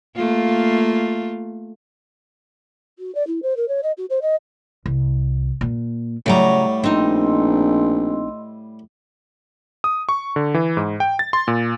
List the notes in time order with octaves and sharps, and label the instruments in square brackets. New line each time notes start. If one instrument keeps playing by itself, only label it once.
[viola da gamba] A3 A#3 F4
[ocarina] F#4
D5
E4
C5
A#4
C#5
D#5
F#4
C5
D#5
[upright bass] C2
A#2
[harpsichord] A2 G3 [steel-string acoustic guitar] C#3 F#3 A#5 [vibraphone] C#5 F#5 C#6
[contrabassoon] A#1 [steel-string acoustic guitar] C4 D#4 [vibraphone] D#5 C6 E6
[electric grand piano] D#6
C#6
D3
E3
G#2
G5
A6
C6
A#2